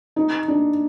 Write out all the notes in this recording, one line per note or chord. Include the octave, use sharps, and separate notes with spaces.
D#4
D4